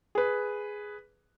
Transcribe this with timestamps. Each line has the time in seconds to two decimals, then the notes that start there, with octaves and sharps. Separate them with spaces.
0.15 G#4 B4